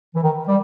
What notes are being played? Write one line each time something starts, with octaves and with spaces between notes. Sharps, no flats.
E3
D#3
G3